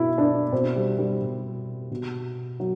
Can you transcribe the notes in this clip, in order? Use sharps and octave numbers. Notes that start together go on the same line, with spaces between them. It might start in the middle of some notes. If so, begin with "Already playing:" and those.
Already playing: B2 E4
D4
B2 C4
G3
G3
B2
B2
F#3